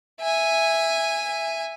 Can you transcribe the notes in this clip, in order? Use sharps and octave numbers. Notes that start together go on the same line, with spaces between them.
E5 G#5